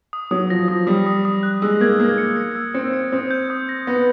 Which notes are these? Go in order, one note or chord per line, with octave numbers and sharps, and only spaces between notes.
D#6
F#3 D#6
F3 A#6
F3 D#6
G3 D#6
D#6
D#6
F#6
G#3 E6
A#3 G#6
A#3 E6
C#7
C#7
E6
C4 C#7
C#7
C4 D#6
G6
D#6
A#6
B3 A#6